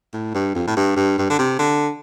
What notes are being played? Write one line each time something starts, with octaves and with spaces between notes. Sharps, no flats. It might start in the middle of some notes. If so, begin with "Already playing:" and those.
A2
G2
F2
A2
G2
G2
G2
D3
C3
D3